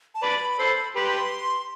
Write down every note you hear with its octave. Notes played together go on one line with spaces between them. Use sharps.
A5
B4 D5 B5
A4 C5
G4 B4 C6